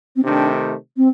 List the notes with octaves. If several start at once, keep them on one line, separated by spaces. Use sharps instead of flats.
C4
C3 D#3 A3 D4
C4